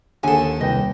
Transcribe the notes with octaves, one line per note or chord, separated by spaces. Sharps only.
D#2 D3 A4 G#5 C6
C2 B4 D#5 G5